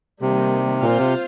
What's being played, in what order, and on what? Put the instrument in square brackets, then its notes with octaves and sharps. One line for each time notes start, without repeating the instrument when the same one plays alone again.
[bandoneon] C3 [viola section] D#3 G3 A#3
[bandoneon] A#2 [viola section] C4 F4 C5 F5
[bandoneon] C3